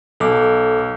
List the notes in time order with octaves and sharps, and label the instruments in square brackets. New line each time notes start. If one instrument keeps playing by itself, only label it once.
[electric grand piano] B1 [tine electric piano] A4 D6